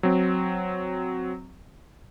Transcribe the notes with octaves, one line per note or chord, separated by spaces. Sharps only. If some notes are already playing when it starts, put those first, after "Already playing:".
F#3 C4